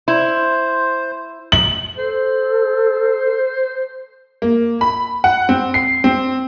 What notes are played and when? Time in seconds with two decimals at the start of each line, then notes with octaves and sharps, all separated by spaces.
0.08 E4 C5
1.52 F#7
1.97 A4 C5
4.42 A#3
4.81 B5
5.24 F#5
5.49 C4
5.74 C7
6.04 C4